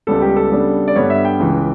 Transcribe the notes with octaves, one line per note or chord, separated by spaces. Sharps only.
C#2 C#3 G3 B3 A4
G4
A4
C#3 G3 B3 D4
D5
G2 D3 G3 B3 C#5
E5
G5
C#2 C#3 E3